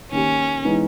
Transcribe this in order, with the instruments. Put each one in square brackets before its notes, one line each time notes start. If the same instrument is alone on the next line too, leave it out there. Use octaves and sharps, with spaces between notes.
[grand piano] D#3 A#3 D#4 G4 [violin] C#4
[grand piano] E3 G#3 B3 D#4